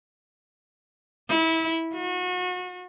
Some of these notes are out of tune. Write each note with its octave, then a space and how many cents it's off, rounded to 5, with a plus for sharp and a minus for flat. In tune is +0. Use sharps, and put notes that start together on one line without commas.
E4 -25
F#4 -35